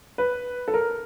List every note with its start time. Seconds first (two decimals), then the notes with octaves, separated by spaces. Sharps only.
0.18 B4
0.68 A4
0.74 A#4